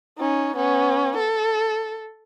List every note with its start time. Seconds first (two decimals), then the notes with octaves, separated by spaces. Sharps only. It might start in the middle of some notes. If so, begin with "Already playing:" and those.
0.18 C#4 D#4
0.56 B3 C#4
1.17 A4